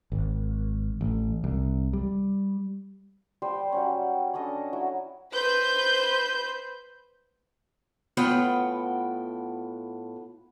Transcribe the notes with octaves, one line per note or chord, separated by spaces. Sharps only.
G#1
A1
C2
G3
G3 C5 G5 B5
F#3 G3 C#4
C#4 D4 A4 D#5
F#3 E4
B4 C5 G6
A2 B3 F4 B4 F#5 G5